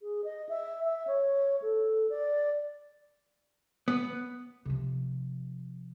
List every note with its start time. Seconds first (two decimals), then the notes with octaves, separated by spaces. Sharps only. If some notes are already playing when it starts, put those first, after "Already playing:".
0.01 G#4
0.24 D#5
0.49 E5
0.84 E5
1.07 C#5
1.62 A4
2.10 D5
3.88 B3
4.65 C3 F3